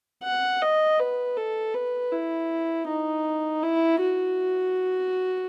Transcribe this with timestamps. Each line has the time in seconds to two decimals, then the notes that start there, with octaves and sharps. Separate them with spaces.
0.23 F#5
0.62 D#5
0.99 B4
1.37 A4
1.74 B4
2.12 E4
2.88 D#4
3.63 E4
4.01 F#4